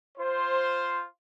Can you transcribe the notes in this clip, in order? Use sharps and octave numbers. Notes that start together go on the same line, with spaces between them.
F4 C5